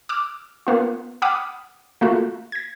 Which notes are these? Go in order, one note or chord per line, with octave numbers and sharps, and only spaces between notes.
D6 E6 F6
A#3 B3 F4
F#5 G5 B5 D6 D#6 F6
A3 A#3 F4 F#4
G#6 A#6